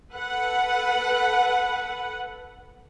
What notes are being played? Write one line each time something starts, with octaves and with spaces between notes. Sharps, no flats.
A4 B4 F#5